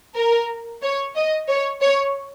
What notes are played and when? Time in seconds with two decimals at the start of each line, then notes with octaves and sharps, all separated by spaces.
0.15 A#4
0.82 C#5
1.15 D#5
1.48 C#5
1.81 C#5